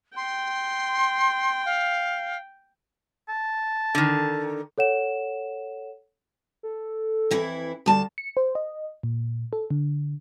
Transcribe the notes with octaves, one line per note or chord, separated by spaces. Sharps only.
G5 C6
F5
A5
D3 D#3
A4 C#5 F#5 E7
A4
F2 E3 E4
D2 G3 A5
C#7
C5
D#5
A#2
A4
D3